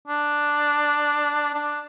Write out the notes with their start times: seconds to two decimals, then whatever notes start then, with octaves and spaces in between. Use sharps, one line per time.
0.08 D4
1.54 D4